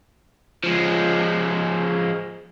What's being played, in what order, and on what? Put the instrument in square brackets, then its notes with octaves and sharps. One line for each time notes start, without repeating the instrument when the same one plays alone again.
[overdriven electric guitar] F3 G#3